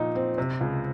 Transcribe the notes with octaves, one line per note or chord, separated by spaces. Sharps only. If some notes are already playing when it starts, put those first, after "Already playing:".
Already playing: A#2 F3 D#4
C4
C3
C#2